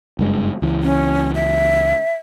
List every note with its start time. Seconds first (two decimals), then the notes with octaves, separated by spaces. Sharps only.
0.19 F#1 G2 G#3
0.62 C#2 E3
0.83 C#4
1.35 E5